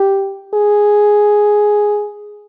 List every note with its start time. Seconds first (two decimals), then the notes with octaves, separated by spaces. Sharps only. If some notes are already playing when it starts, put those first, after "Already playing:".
Already playing: G4
0.54 G#4